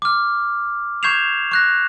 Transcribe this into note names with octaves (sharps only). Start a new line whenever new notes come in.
D6 F6
C#6 G6 G#6 C7 E7 F7
C#6 F#6 A#6